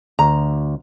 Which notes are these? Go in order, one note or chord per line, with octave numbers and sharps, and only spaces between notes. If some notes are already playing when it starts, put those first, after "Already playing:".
D2 A#5